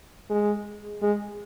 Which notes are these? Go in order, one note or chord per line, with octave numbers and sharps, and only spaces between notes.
G#3
G#3